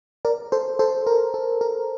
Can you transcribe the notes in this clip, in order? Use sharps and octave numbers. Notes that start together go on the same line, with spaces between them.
A#4 D5
A4 C5
A4 C5
A#4
A4
A#4